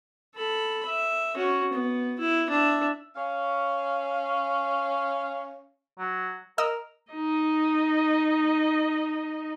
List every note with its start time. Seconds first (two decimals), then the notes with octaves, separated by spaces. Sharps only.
0.35 A4 B5
0.86 E5
1.35 C#4 F#4
1.73 B3
2.19 E4
2.50 D4 E5
3.16 C#4 F5
5.99 F#3
6.58 A#4 D#5 E6
7.12 D#4 D#5